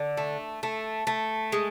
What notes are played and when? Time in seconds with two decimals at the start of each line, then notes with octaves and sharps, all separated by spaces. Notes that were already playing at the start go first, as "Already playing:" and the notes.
Already playing: D3
0.17 A3
0.63 A3
1.07 A3
1.52 G#3